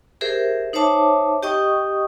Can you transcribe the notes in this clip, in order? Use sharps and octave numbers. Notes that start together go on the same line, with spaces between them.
G4 G#4 A#4 C5 E5
D#4 C5 C#5 E5 A5 D6
G4 D#5 G5 C#6 D#6